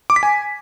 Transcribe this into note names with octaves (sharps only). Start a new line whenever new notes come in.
D6
B6
G#5